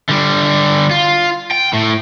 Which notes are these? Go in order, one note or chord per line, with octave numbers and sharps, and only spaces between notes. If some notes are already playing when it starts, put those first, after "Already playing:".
D3 G3
F4
G5
A2